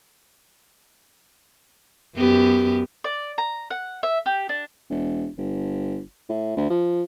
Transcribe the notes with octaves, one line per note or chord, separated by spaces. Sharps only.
F#2 B3 G4
D5
A#5
F#5
E5
G4
D4
E1
G1
A2
D2
F3